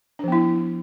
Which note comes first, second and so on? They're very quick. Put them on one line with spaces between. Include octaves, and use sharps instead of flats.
D4 F3 B3 E4